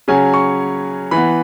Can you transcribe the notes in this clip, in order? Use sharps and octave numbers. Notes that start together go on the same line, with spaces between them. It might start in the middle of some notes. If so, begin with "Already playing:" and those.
C#3 F#3 C#4 G#5
C#6
E3 B3 B5